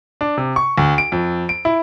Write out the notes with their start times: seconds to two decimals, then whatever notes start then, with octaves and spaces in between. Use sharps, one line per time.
0.21 D4
0.37 C3
0.56 C#6
0.78 D2
0.98 D7
1.12 F2
1.49 D7
1.65 E4